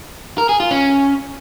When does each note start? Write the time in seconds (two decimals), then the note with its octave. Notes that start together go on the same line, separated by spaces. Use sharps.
0.38 A#4
0.49 G#4
0.60 F4
0.71 C#4